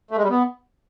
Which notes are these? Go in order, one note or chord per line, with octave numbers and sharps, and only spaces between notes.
A3
G#3
G3
B3